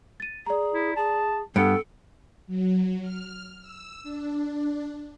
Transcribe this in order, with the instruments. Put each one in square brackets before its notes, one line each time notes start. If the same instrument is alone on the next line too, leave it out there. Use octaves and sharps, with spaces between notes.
[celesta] A6 D#7
[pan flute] G#4 [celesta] D5 A#5
[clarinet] E4
[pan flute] G#4 [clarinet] A5
[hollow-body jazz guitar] G2 [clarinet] B3 [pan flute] A4 [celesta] C#7 D7
[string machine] F#3
F6
E6
D4